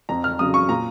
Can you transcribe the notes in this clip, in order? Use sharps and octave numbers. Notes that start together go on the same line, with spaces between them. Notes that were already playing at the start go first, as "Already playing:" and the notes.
F2 A#5
F6
C#3 F#3 D#6
C#6
A#2 A#5